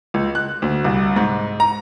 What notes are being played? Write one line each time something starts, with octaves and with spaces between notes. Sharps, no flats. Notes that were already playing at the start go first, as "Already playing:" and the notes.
C#2
F#6
D2
C2
G#2
A#5